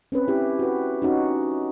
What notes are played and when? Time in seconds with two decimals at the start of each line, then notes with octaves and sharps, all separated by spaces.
0.12 C4 C#4 B4
0.28 E4 G4
0.59 F#4 B4
1.02 C#4 D#4 F#4